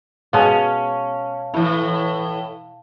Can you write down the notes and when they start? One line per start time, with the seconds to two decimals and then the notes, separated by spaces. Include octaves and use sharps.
0.33 B2 G#3 B3 C#4 F5 A5
1.54 A2 E3 E4